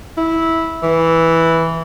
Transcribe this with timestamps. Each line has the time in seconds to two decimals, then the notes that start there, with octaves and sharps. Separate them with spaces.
0.17 E4
0.82 E3